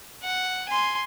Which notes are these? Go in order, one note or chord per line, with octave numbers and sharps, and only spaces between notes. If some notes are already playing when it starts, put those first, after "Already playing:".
F#5
G#5 C6